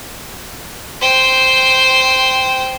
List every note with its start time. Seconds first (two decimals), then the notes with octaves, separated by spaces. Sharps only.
1.01 C5 G5